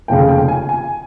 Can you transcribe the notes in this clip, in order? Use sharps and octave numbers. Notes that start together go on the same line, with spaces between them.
F1 D#2 C#3 G5
G5
G#5
G#5